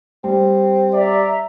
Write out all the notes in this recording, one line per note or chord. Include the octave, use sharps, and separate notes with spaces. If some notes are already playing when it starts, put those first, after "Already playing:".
G3 C4
D5 E5 A#5